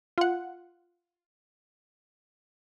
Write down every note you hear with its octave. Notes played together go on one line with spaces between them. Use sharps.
F4 F#5